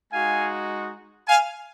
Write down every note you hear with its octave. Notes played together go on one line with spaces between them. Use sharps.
G#3 D#4 F#4 F5 G#5
F5 G#5